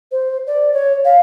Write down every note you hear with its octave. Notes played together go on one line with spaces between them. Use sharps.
C5
D5
C#5
F5